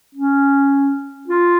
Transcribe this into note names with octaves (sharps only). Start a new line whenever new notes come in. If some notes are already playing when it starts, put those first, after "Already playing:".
C#4
F4